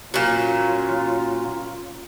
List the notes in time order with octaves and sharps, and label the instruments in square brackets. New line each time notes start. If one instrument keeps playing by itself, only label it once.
[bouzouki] A#2 F#3 [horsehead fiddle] C#4 F4